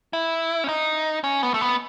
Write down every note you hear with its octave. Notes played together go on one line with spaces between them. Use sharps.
E4
C#4
D#4
C#4
B3
A3
B3